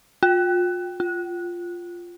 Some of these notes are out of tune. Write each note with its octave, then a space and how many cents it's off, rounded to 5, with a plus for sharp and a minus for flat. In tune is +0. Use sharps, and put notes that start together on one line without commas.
F4 +35
F4 +0